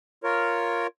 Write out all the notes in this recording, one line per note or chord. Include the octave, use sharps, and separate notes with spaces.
F4 A#4 C#5